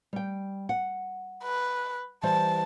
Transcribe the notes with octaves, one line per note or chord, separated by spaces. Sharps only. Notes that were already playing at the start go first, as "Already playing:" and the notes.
G3 G5
F#5
B4
E3 G3 C5 A5